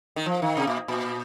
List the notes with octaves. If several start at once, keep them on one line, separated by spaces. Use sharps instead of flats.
D#3
F3
D#3
C3
A#2
A#2